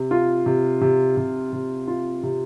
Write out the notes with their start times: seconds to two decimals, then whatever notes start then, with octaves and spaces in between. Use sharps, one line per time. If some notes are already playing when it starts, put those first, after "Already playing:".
Already playing: C3
0.11 F4
0.46 C3
0.81 C3
1.17 C3
1.53 C3
1.88 F4
2.23 C3